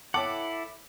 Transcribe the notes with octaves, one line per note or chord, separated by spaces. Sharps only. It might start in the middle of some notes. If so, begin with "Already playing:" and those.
E4 A4 C#5 F#5 G5 A5 D6